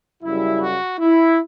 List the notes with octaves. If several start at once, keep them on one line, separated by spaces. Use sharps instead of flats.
F#2 C#3 G3 E4
F#4
E4